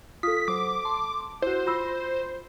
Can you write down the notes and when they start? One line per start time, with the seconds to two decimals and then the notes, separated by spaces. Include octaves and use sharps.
0.23 F4 A4 D#6 B6
0.48 F#3 C5 D6
0.85 A5 C6
1.42 E4 F#4 C5
1.67 F4 B5 E6 A#6